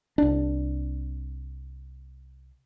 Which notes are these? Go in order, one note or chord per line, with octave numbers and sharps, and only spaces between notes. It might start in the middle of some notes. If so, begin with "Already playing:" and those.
C2 D4